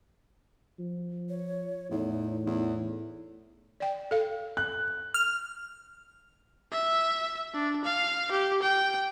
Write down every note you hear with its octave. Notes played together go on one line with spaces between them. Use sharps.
F3
C#5
E2 A2 D#4
E2
D5 G5
A4 F5
F#6
F6
E5
D4
F5
G4
G5